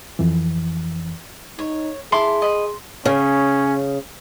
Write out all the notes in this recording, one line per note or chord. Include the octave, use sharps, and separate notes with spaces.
F2 E3
D#4 C#5
E4 G#4 A5 C6 D6
D#5 B5
C#3 C#4